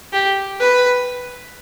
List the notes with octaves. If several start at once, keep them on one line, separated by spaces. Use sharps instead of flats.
G4
B4